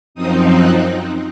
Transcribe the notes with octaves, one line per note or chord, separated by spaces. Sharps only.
F#2 F3 C4 D#4 D#6
F#6